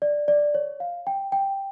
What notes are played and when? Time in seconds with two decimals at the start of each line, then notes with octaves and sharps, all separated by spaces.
0.02 D5
0.28 D5
0.54 C#5
0.80 F5
1.07 G5
1.32 G5